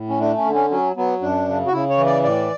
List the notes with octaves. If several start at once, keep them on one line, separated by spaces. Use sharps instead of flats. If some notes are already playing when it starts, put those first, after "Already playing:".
Already playing: A2
C#4
A3 D4
C#4
D3
C#4
F#3 C#4
F#3 B3
F#2 D4
C#3
F#4
C#3 E4
C#5
E3
D5
A2 D5